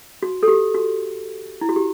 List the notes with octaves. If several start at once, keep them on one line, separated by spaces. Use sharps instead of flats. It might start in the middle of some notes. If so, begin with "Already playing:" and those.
F#4
A4
G4
F#4
E4
F#4
G4